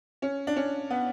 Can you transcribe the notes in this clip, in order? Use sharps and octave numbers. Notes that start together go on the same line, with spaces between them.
C#4
D4
C#4
B3